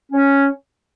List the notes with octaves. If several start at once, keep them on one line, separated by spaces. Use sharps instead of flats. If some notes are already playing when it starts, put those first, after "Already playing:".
C#4